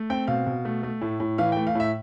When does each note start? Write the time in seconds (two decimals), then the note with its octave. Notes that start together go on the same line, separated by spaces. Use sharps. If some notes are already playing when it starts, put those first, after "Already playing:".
Already playing: A3
0.10 C4 G5
0.27 B2 F5
0.47 B2
0.65 A3
0.83 A3
1.01 A2
1.20 A2
1.38 E3 F5
1.52 A3 G5
1.67 F5
1.75 A2 E5